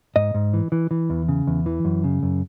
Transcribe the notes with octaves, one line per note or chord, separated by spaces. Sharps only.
G#2 D#5
G#2
E3
E3
E3
E2
C#3
E2
E3
F#2
C#3
F#2